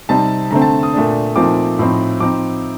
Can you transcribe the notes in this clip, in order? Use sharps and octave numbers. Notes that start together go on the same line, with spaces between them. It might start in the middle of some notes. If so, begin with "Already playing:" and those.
C3 G3 C4 D#4 A5
D3 A3 C4 A#5
A5
D#6
A#2 A3 D4
A#2 F3 A3 C4 D#4 D6
A2 F3 C4 D#4
F3 C4 D#4 D6